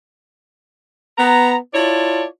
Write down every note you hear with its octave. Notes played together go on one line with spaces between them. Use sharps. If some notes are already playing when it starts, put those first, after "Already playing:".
B3 A#5
E4 F4 C#5 D5 A5